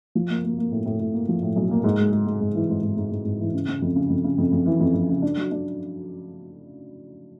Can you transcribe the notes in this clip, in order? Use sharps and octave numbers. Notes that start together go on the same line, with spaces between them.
F3
A#3
A#3
A#3
A2
A2
A2
A#3
F3
A2
B1
A#3
G#2
G#3
G#3
G#3
G#2
E3
G#2
G#2
G#2
G#2
G#2
E3
C#3
C#3
F2
C#3
F2
C#3
F2
F2
E3
F2
F2
C#3
D4
F#3
D4